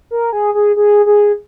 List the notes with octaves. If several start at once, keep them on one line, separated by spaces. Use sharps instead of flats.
A#4
G#4
G#4
G#4
G#4